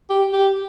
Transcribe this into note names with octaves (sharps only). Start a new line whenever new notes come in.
G4
G4